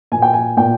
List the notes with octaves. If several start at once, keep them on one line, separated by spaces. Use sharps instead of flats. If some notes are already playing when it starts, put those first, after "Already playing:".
A#2 G#5
G5
G#5
A#2 G5